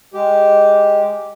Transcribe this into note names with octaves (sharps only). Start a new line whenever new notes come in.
G#3 G4